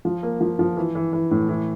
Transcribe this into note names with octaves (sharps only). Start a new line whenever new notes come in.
F3
A#3
F3
F3
E3
E3
E3
A2
E3